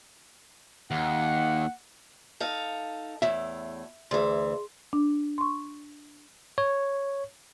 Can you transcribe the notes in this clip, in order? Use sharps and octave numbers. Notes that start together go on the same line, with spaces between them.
D#2 F#5
D#4 A4 F5
E2 A2 E5
D2 E3 G#4 C6
D4
C6 C#6
C#5